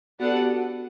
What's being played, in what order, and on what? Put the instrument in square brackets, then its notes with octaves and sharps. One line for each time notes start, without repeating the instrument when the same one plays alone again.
[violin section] B3 D4 A4 D5 F#5 [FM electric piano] F#4
[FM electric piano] G4
F#4